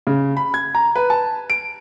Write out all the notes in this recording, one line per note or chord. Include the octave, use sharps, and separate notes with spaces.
C#3
B5
G#6
A#5
B4
A5
D7